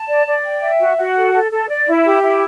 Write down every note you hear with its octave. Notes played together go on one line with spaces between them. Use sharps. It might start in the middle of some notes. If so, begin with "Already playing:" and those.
Already playing: A5
D5
D5
G5
E5
F#4
F#4
A4
A4
A4
D5
E4
G4
E4